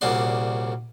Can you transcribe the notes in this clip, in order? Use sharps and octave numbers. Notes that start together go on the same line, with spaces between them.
C2 A#2 C#3 F#4 D5 C6